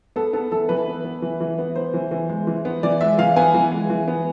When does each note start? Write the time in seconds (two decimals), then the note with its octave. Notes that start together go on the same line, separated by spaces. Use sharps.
0.16 B3 A4
0.33 B3 A4
0.51 E3 A4
0.69 E3 B4
0.88 B3
1.05 B3
1.22 E3
1.40 E3
1.59 B3
1.76 B3 C5
1.94 E3
2.11 E3
2.29 G#3
2.47 E3
2.65 B3
2.83 E3 D5
3.01 G#3 E5
3.18 E3 F5
3.36 B3 G#5
3.54 E3
3.72 G#3
3.90 E3
4.08 B3